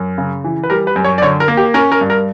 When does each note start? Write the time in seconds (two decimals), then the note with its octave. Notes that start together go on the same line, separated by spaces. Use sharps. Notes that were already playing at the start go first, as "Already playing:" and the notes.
Already playing: F#2
0.18 C#3
0.44 E3
0.63 B4
0.70 G3 A#4
0.87 B4
0.96 F#2
1.04 C#5
1.18 D5
1.22 D3 C#5
1.40 A#4
1.48 A#3
1.57 G4
1.74 C#4 A#4
1.92 A#4
2.01 G2
2.10 A#4